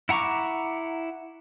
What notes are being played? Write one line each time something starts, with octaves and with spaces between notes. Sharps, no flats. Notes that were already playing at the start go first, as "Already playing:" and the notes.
E4 F#5 A#5 C#6 D6